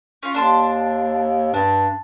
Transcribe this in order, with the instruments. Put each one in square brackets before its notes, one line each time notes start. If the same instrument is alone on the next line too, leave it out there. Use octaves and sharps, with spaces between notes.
[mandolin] C#4 F4
[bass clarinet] D#2 [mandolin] D4 A5 C6
[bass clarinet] G2 [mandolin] D4